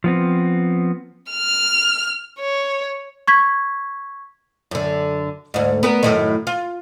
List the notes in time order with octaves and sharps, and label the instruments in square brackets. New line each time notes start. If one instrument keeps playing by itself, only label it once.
[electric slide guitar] F3 B3 C4
[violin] F6
C#5
[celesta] C#6 G#6 B6
[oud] F#2 D3
D2 G#2
B3 A#4
F#2 A2 D#3
F4